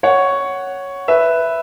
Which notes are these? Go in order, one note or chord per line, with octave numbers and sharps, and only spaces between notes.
C#5 F#5
B4 E5